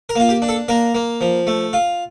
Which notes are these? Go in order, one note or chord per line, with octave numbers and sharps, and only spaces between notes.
A#4
A#3 F4
G4
D4
A4
A#3 A#4
A#3
F3
A3
F4